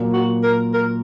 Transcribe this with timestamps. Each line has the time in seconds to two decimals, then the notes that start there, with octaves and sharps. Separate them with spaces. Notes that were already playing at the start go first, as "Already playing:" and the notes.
Already playing: A#2 F#3 A#3
0.13 F#4
0.43 A#4
0.74 A#4